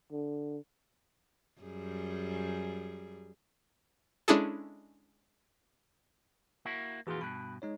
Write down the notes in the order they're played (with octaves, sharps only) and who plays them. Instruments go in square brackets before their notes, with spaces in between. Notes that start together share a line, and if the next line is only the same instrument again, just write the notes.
[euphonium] D3
[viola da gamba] F#2 G3 G#4
[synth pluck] G#3 C#4 D4 E4 G#4 A4
[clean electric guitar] A#3 E4 F#4
[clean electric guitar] F2 A#2 F4 [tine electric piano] E3 F#4 G#4
[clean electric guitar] G2 B2 [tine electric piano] B5 F#6
[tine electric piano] G#3 D#4 C#5